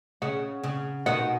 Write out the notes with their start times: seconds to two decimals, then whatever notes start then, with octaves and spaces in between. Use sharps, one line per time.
0.22 C#3 F#5
0.63 C#3
1.06 B2 D#3 F#5